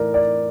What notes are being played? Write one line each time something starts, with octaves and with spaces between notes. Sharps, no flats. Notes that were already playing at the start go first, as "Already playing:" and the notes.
Already playing: A2 E3 A#4 D5
D5